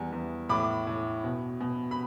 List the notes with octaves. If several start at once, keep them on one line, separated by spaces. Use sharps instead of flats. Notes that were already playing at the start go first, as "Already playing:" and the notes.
Already playing: E2 G3
E2
A2 B5 D6
A2
B2
B2
B5